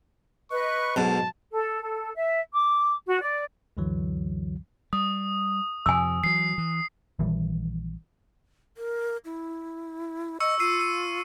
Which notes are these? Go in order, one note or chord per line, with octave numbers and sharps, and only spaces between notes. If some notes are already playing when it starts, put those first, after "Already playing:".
B4 D#5 C#6 F#6
B1 G#2 B2 A5
A4
A4
E5
D6
F#4
D5
C#2 F#2 D3 E3 F#3
G3 D#6
F2 C3 F3 G#5 E6
E3 F#3 C7
E3
A#1 D#3 E3 G3
A#4
E4
D#5 C#6 E6 C#7
F4 E6 C7 D#7
E6 D#7